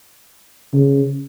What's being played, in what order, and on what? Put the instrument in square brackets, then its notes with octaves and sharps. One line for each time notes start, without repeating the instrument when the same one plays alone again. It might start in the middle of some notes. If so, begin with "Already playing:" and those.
[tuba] C#3